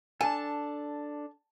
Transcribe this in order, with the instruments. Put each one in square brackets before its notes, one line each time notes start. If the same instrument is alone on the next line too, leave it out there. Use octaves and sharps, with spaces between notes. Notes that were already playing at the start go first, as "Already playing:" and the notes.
[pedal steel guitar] D4 A4 [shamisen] G#5 [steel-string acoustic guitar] A5